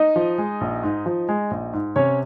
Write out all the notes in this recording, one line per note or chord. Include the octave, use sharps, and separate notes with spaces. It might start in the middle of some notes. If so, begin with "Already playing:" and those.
Already playing: D#4 D#5
F3
G#3
A#1
G#2
F3
G#3
A#1
G#2
C3 C#4 C#5